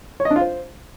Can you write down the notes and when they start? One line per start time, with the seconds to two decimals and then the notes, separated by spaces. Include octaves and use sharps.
0.20 C#5
0.25 D#5
0.31 D4
0.36 F4
0.41 C5